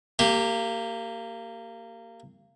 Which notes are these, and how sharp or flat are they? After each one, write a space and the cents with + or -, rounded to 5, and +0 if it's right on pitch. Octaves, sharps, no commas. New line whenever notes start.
A#3 -25 G4 +0